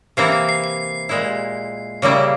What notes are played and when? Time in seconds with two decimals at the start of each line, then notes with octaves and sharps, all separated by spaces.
0.17 C3 E3 A#3 E4 C7
0.32 C7
0.49 C7
0.64 C7
1.09 A#2 G#3 E4
2.02 C#3 G3 A#3 E4